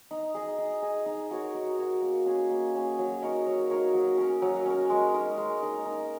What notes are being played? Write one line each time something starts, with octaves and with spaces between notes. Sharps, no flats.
D#4
G#4 D#5
D#4
G#4 D#5
D#4
F#4 A#4 C#5
D#4
F#4 A#4 C#5
A#3
C#4 G#4 C#5
A#3
C#4 G#4 C#5
F#3
D#4 A#4 C#5
F#3
D#4 A#4 C#5
F#3
C#4 A#4
F#3
C#4 A#4
G#3
D#4 A#4
G#3
D#4 A#4
D#4